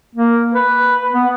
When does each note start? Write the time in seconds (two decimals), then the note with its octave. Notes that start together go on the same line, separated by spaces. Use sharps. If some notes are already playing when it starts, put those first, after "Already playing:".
0.15 A#3
0.55 B4
1.13 B3